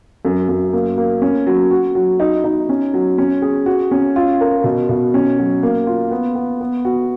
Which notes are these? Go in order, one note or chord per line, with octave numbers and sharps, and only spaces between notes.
F#2
F#2
A#3
A#3
C#4
F#3
F#4
F#3
D#4
D#4
C#4
F#3
C#4
G#4
F#4
C#4
F4
A#4
B2
B2
C#4
F#3
A#3
F4
B3
B3
B3
F#4